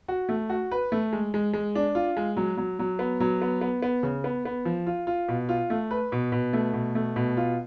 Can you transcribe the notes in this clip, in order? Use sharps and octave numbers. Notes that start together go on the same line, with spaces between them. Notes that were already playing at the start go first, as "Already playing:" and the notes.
F#4
A3
F#4
B4
A3
G#3
G#3
G#3
D4
F4
G#3
F#3
F#3
F#3
B3
F#3
B3
B3
B3
C#3
B3
B3
F3
F4
F4
B2
F4
A3
B4
B2
B2
A3
B2
A3
B2
F4